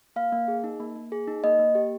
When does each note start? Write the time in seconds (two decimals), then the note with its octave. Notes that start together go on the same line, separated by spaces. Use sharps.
0.16 A#3 F5
0.32 A#3
0.48 G#4
0.64 D#4
0.80 A#3
0.96 A#3
1.12 G#4
1.28 D#4
1.44 A#3 D#5
1.59 A#3
1.75 G4